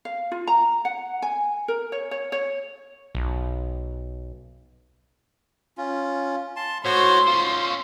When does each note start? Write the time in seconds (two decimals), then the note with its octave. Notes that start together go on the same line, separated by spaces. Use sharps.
0.05 F5
0.32 F4
0.47 A#5
0.85 F#5
1.22 G#5
1.68 A#4
1.92 C#5
2.11 C#5
2.32 C#5
3.15 B1
5.78 C#4 F4
6.56 A5 C6
6.85 A2 F#4 C5 C#5 C6
7.27 C#4 F4 C5